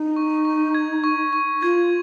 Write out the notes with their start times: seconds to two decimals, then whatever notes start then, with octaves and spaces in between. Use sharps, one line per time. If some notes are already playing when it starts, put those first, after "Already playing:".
Already playing: D#4
0.16 C#6
0.45 C#6
0.75 G#6
1.04 C#6
1.33 C#6
1.62 F4 G#6